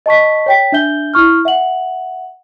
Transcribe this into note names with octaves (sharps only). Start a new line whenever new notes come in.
D#5 A5 C#6 B6
C#5 G5 B6
D4 E5 G6 G7
E4 C#6 F6
E5 F#5 F#7